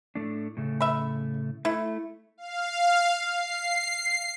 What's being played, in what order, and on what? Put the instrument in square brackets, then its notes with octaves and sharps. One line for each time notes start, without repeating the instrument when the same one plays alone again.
[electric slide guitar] A2 A3 D4
A2 C#3 A3
[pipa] E5 B5
[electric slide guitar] A3 [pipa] E4
[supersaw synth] F5
C7